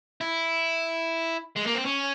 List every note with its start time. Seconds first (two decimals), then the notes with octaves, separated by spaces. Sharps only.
0.21 E4
1.56 G#3
1.67 A#3
1.75 C4
1.86 C#4